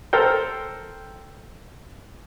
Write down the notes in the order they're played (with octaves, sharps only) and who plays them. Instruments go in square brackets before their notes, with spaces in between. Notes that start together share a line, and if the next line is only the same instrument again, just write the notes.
[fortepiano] A4 A#4 C5 G5